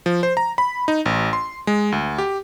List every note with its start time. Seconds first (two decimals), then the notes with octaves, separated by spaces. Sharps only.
0.06 F3
0.23 C5
0.37 A#5
0.58 B5
0.88 D#4
1.06 A1
1.33 C6
1.67 G#3
1.92 D2
2.18 G4